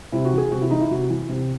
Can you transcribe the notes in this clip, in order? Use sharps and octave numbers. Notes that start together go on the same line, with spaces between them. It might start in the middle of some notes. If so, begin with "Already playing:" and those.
C3 E4
F#4
E3
G#4
C3 F#4
E4
E3 D#4
E4
C3 F#4
E3
C3